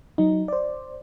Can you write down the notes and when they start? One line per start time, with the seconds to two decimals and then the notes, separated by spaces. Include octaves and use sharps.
0.18 F#3 D#4
0.48 C5 D5